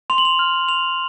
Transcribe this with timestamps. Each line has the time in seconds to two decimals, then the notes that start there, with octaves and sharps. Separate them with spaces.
0.10 C6 F7
0.18 F#7
0.25 F7
0.39 F6
0.68 C6 F7